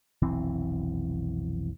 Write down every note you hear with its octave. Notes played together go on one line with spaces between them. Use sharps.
F1 B1 E3 C4